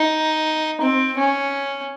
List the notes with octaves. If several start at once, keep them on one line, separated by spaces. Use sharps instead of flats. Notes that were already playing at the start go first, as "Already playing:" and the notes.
Already playing: D#4
C4
C#4